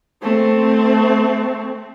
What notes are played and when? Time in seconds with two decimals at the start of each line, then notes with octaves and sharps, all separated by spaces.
0.22 A3 C4